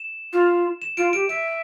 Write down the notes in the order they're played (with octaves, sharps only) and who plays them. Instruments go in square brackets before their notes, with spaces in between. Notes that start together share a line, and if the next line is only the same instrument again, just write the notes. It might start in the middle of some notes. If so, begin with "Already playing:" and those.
Already playing: [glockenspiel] E7
[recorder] F4
[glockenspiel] E7
[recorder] F4 [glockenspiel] D7
[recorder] G4 [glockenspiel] D7
[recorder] E5 [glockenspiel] D7